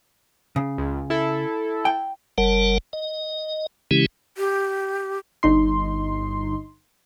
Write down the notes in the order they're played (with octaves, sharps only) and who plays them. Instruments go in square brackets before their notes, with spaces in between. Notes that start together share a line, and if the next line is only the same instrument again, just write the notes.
[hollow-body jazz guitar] C#3
[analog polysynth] C#2
E4 A4
[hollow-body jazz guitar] G5
[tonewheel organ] F#1 G3 A#4 F#5 A5
D#5
C#3 E3 G#3 C#4 E4 G4
[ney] G4
[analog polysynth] G1 D#4 C6